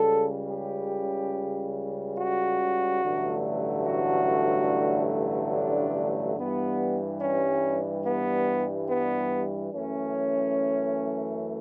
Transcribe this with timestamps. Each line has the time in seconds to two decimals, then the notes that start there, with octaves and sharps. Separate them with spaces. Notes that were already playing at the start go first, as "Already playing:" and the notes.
Already playing: C#2 C#3 G3 A4
0.51 G4
2.19 F#4
3.02 A1 G2 D3 F#3 A3
3.86 F#4
5.54 D4
6.38 G2 E3 G3 B3
7.22 C#4
8.06 B3
8.90 B3
9.73 F#2 E3 A3 C#4